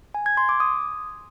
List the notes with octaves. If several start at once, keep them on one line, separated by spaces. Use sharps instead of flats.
G#5
G#6
C6
D6
D#6